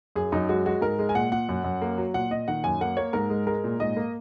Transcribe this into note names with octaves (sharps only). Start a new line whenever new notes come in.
F#2 G#4
F#2 D#4
G#3 F#4
G#3 F#4
G#2 A#4
G#3
G#5
A#2 F#5
A#2 F#5
F#2
F#2
A#3
F#3
A#2 F#5
A#2 D#5
D#3 F#5
F#2 G#5
A#3 F#5
A#3 C#5
G#2 A#4
G#3
G#3 A#4
A#2
G#2 D#5
A#3